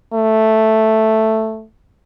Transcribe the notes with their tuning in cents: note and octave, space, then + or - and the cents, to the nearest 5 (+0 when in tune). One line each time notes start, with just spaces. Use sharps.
A3 +0